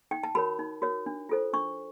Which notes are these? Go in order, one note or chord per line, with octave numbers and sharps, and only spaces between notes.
D#4 G5
A5
F#4 A#4 C#5 B5
D#4
F#4 A#4 C#5
D4
F4 A4 C5
D4 C#6